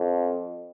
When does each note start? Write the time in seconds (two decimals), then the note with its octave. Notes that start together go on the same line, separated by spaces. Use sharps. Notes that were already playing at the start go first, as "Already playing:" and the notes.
Already playing: F2